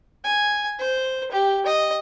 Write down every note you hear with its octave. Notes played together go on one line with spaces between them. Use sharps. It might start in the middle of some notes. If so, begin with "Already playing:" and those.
G#5
C5
G4
D#5